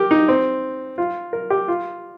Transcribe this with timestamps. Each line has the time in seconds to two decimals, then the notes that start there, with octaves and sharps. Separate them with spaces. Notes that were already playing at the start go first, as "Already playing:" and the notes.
Already playing: G4 A#4
0.11 D#4
0.28 C4
0.98 F4
1.33 A#4
1.50 G4
1.68 F4